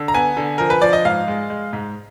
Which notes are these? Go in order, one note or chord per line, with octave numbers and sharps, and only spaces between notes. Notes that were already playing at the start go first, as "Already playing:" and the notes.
Already playing: D3
A#5
B3 G#5
D3
F3 A#4
B4
F3 D5
D#5
G#2 F5
G#3
G#3
G#2